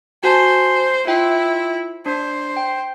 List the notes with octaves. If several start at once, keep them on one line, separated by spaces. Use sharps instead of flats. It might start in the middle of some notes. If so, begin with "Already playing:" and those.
F#4 C5 G#5 A5
E4 F4 G5
D4 C5
G5